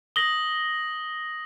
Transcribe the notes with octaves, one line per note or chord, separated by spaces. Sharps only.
D#6 A#6 F#7 G7